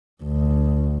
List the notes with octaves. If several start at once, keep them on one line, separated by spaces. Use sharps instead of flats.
D2